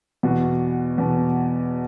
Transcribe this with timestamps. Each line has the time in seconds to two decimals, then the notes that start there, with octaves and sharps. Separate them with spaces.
0.23 E2 B2 F#4
0.98 E2 B2